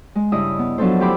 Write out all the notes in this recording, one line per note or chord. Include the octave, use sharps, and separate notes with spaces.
G#3
G2 C#3 E4 D#5 D#6
B3
F3 F#3 B3 D4 A4 C5
D2 E4 G4 C5 B5 D6